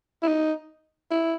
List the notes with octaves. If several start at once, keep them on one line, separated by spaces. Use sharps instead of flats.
E4
D#4
E4